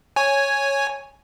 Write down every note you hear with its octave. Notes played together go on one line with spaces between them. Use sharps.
C#5 G#5